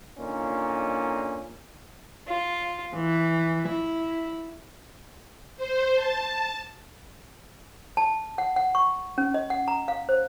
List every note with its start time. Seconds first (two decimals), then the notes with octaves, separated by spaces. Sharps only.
0.19 A#2 D3 C#4 D#4
2.30 F4
2.95 E3
3.68 E4
5.57 C5
5.95 A5
7.97 A5
8.38 F#5
8.56 F#5
8.75 C#6
9.18 C#4
9.34 D#5
9.50 F#5
9.68 A#5
9.88 F5
10.09 C5